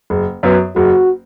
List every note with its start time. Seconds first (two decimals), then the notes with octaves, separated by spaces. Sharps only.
0.10 F#1
0.43 F#2 F#3 B3
0.76 F#1 F#4